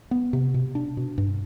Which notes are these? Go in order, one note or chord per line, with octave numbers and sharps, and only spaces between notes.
B3
C3
B2
D4
B2
G2